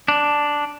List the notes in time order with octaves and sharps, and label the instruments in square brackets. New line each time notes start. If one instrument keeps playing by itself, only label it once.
[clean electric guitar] D4